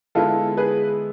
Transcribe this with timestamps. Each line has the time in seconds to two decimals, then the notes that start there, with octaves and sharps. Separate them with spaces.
0.15 D3 G#3 B3 E4 F4 A4
0.57 G#4 B4